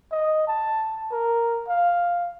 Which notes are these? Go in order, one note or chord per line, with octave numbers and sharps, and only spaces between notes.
D#5
A5
A#4
F5